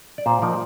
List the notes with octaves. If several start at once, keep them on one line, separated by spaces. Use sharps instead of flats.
D5
A#2 C5
F3 A#3 D#4 D5